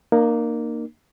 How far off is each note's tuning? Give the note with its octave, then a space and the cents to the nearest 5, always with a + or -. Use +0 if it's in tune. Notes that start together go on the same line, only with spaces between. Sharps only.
A#3 +0 D#4 -40